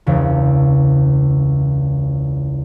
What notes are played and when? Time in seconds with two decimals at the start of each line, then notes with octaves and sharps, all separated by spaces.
0.06 E1 C#2